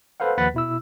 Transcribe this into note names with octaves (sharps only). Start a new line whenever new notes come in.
A4 B4 C5 F5 F#5
D#2 F3 B4 F#5 A6 B6
B2 E4 E6